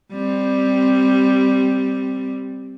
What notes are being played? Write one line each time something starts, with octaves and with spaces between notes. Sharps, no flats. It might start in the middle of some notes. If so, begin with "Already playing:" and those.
G3 C4